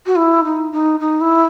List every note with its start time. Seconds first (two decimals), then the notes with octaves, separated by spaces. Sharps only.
0.06 F#4
0.16 E4
0.45 D#4
0.72 D#4
1.00 D#4
1.21 E4